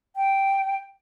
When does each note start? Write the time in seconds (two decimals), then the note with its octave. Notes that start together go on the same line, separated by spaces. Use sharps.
0.16 G5